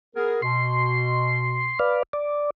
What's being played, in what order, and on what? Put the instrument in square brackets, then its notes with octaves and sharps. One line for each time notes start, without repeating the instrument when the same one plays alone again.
[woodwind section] B3 G#4 A#4
[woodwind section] B2 [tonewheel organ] C6
[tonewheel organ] B4 D5 F5
D5